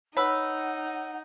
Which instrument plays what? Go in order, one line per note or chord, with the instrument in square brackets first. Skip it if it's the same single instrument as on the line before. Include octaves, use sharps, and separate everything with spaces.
[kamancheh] D#4 [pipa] B4 [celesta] C#5 E6 [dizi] F#5